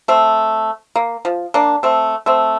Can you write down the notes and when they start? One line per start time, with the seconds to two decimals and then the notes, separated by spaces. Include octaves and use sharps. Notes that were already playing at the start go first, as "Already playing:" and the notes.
0.08 A3 C4
0.96 A#3
1.25 F3
1.54 A#3 D4
1.83 A3 C4
2.26 A3 C4